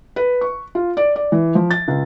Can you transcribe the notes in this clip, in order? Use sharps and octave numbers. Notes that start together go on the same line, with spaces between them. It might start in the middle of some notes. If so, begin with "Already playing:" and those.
B4
C#6
F4
D5
D5
E3
F3
A6
C#2